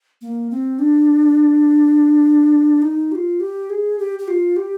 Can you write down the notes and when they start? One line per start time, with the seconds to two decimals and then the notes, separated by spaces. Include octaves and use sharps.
0.21 A#3
0.51 C4
0.79 D4
2.82 D#4
3.12 G4
3.15 F4
3.40 G4
3.70 G#4
3.99 G4
4.19 G4
4.28 F4
4.56 G4